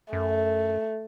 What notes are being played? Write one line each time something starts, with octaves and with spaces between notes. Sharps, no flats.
F#2 A3